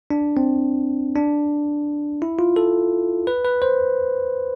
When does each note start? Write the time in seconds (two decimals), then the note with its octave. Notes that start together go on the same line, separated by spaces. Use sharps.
0.11 D4
0.37 C4
1.16 D4
2.22 E4
2.39 F4
2.56 A4
3.27 B4
3.45 B4
3.62 C5